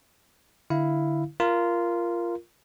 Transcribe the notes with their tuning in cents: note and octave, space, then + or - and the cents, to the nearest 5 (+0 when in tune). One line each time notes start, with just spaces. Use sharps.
D3 +0 E4 +0 F5 +0
F4 -15 A#4 +0